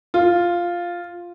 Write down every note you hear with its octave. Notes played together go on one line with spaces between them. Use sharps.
F4